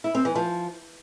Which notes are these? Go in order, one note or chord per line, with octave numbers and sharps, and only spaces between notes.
E4
C4
E3
F3